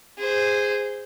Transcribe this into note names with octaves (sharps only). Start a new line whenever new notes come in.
G#4 C5